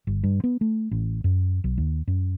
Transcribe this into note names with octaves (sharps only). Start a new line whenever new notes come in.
G1
G2
B3
A3
A1
F#2
B1
D#2
F#2